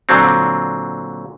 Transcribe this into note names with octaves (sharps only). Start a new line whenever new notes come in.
A#2 D3 F#3 C4